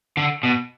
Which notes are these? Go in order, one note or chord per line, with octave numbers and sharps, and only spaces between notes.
D3
B2